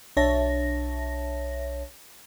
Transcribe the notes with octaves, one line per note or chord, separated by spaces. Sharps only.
B1 D4 C#5 E5 A5 A#6